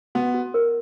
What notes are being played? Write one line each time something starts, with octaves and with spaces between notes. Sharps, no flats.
B3 F#4
F#4
A#4